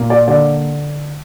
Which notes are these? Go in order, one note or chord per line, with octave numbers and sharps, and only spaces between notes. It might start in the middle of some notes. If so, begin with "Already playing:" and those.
Already playing: A#2 A#3
D5
D3 D5